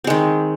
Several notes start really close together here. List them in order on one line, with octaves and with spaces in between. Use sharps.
C4 G#3 D#3